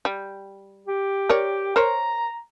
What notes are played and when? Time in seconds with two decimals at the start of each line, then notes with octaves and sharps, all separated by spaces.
0.05 G3
0.87 G4
1.29 A#4 C#5 D5
1.76 A#4 C5 C#5 A#5